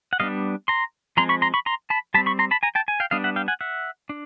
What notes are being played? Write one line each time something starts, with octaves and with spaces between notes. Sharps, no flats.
F#5
G3 B3 D4 D#5 F5
A#5 C6
F3 G#3 C4 A#5 C6
B5 C#6
A#5 C6
B5 C#6
A#5 C6
A5 B5
G3 C4 A5 B5
B5 C#6
A#5 C6
A5 B5
G#5 A#5
G5 A5
G#5
F5 G5
G3 B3 D4 D#5 F5
E5 F#5
F5 G5
F#5 G#5
E5 F#5
D4